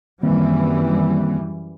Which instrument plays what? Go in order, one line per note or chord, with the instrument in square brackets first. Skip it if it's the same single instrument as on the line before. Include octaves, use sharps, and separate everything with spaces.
[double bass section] F#2 E3 G3 [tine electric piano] D#3 A#3 C4